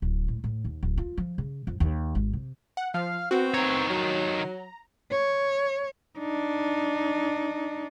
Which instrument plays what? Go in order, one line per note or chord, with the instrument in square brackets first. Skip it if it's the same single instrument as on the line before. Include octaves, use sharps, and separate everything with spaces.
[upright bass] D1
A2
A2
D#2
D1
F4
F3
C#3
F2
D#2
G#1
C3
[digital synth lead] F#5
[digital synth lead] F3 [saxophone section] F5
[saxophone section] B3 C4 [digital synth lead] F#4
[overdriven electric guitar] D#3 C#5 [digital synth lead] A#5
[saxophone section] F#3
[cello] C#5
D4 D#4